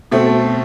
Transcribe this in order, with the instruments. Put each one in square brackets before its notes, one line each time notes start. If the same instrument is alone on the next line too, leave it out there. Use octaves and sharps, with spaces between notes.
[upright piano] B2 A3 C4